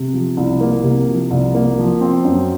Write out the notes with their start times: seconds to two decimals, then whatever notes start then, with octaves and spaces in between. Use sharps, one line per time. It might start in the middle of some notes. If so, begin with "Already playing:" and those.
Already playing: C3
0.13 F3
0.37 C2
0.61 A#3
0.84 C3
1.08 F3
1.31 C2
1.55 A#3
1.78 F3
2.01 C4
2.24 F#2